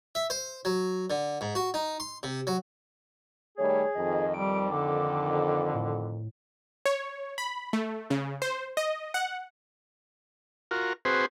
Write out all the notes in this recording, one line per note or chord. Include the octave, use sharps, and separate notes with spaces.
E5
C5
F#3
D3
G#2
F#4
D#4
C6
C3
F#3
D#3 G3 A3 G#4 C#5
F2 D#3 D#5
G3 D7
D3 D6
A2
C#5
B5
A3
C#3
C5
D#5
F#5
F4 F#4 A#4
C4 F#4 G#4 B4 C5